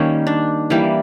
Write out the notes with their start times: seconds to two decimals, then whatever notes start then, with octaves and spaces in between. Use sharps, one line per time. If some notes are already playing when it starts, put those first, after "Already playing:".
Already playing: D#3 G3 A#3 C#4
0.27 D4
0.70 E3 G3 A#3